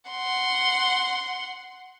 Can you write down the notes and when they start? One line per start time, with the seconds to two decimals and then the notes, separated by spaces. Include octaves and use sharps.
0.10 F#5 C6